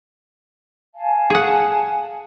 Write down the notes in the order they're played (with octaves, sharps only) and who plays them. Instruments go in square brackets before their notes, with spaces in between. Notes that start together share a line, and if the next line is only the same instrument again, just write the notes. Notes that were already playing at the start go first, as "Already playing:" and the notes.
[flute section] F5 G#5 A5
[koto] G#4 F#5